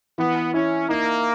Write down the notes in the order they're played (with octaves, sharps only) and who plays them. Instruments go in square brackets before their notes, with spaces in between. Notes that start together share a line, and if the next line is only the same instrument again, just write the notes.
[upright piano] E3 [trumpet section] B3
[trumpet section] C#4 [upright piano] E4
[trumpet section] A#3 [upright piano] D#4